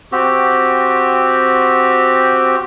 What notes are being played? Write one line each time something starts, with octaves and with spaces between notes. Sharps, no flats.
C4 F#4 G4